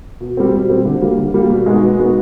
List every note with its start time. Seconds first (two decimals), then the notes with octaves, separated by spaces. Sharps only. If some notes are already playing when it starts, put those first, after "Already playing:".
0.20 B2
0.37 G3 C4
0.53 B2
0.69 G3 C4
0.85 D3
1.02 G3 A#3
1.18 D3
1.34 G3 A#3
1.50 B2
1.66 G#3 B3 D#4 F#4
1.83 B2
1.99 G#3 B3 D#4 F#4